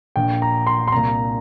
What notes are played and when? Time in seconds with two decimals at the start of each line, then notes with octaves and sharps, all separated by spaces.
0.16 A#1 A#2 G5
0.42 A#5
0.67 C6
0.88 C6
0.92 C2 A#2 A#5